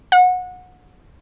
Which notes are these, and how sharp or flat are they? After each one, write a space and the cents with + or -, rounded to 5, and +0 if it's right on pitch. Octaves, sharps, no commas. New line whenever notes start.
F#5 -25